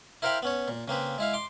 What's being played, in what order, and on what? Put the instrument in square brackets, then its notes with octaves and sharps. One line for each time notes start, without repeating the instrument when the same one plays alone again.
[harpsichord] E4 A#4 C5 F5 G5 B5
B3 C#4 C#5
A#2
C#3 A#3 C4 B4
G#3 E4 F5
C6 D6